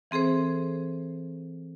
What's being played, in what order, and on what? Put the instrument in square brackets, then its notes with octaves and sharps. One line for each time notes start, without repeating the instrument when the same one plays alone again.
[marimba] E3 C4 G#4 A4 C5